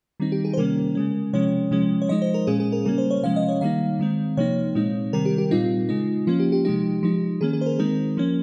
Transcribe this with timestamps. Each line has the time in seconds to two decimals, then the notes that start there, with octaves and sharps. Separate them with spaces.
0.20 D#3 G3 C4 D#4
0.32 G4
0.45 G#4
0.53 C5
0.57 C3 D#3 G3 A#3 C#4 A#4
0.95 C#3 G#3 C#4
1.33 C3 F3 G#3 C#4 C#5
1.71 C3 F3 G#3 C#4
2.02 C#5
2.09 F3 G#3 D#4 D#5
2.22 C5
2.34 A#4
2.47 A#2 G#3 C#4 G#4
2.60 G#4
2.72 A#4
2.85 C#3 G3 A#3 C#4 A#4
2.98 C5
3.11 C#5
3.23 C3 F3 G#3 C#4 F5
3.36 D#5
3.48 C#5
3.61 D#3 G3 A#3 D#4 F5
3.99 D#3 G#3 C4
4.37 C3 F3 A#3 D#4 C#5
4.75 A#2 G#3 C4 D#4
5.13 C3 D#3 G3 C4 A#4
5.25 G4
5.38 G4
5.51 A#2 G3 C4 D#4 F4
5.89 C#3 G#3 D#4
6.27 F3 A#3 C#4 F4
6.40 G4
6.52 G4
6.65 C3 F3 G#3 D#4 G4
7.03 F3 G#3 D#4
7.41 D#3 A#3 C#4 G#4
7.53 G#4
7.61 C5
7.66 A#4
7.79 D#3 G#3 C4 D#4 A#4
8.17 F3 A#3 C#4